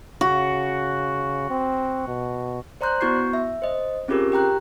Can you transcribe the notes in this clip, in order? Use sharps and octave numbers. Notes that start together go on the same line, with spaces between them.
C#3 F#4
C4
B2
C5 D5 A#5 C6 F#6 G6
B3 E4 F#4 C#6 G6 C7
E5
C5 D#5
C4 C#4 F4 G4 G#4 A#4
G4 G5 A#5 F#6